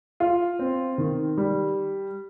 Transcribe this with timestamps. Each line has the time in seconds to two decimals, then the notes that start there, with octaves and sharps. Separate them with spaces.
0.20 F4
0.59 C4
0.98 D#3
1.37 G3